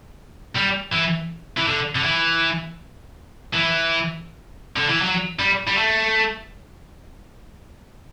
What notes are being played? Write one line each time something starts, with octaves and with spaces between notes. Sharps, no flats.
G3
E3
E3
D3
D3
E3
E3
D3
E3
F#3
G3
G3
A3